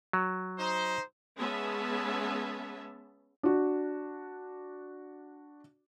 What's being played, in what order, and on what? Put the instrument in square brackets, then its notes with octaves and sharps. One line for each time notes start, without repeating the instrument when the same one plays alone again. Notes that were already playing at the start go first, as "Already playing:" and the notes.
[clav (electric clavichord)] F#3
[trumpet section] D#4 C5
[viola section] G#3 B3 C#4 G#4 E5 A5
[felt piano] D4 F#4